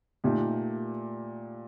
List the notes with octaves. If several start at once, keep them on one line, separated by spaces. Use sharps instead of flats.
A#2 A3 D#4 G4